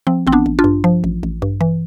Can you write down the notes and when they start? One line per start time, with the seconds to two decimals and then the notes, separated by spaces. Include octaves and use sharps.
0.07 F3 C4
0.27 A1 C4
0.32 B3 D4
0.46 A1
0.59 D4 F4
0.64 G2
0.84 F3
1.04 A1
1.23 A1
1.42 G2
1.61 E3